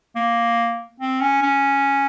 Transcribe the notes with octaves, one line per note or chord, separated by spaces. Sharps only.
A#3
C4
C#4
C#4